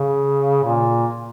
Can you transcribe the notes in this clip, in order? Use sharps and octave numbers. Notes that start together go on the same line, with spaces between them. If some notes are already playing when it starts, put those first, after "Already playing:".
Already playing: C#3
A#2